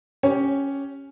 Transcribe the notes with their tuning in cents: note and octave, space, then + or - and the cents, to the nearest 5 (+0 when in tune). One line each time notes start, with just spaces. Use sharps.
C#4 +0 G4 +0 C#5 +5